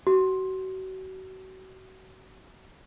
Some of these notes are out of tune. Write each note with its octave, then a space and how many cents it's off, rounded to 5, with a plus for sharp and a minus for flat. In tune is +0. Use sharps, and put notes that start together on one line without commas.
F#4 +30